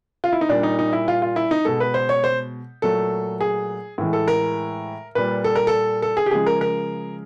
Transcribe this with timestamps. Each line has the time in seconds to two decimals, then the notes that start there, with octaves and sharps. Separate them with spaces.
0.24 F4
0.32 E4
0.41 D#4
0.49 A#2 G3 D4
0.63 D#4
0.79 D#4
0.93 E4
1.08 F4
1.22 F4
1.36 E4
1.51 D#4
1.65 B2 G#3 A4
1.80 B4
1.94 C5
2.09 C#5
2.24 C5
2.82 A#2 F#3 A3 A4
3.41 G#4
3.98 A2 E3 G#3
4.13 A4
4.28 A#4
5.15 A#2 G3 B4
5.44 A4
5.55 A#4
5.67 A4
6.02 A4
6.17 G#4
6.26 G4
6.31 C#3 F3 G#3 G#4
6.46 A#4
6.61 A#4